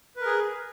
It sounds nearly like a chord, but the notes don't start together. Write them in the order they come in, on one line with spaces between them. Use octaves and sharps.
B4 A#4 G#4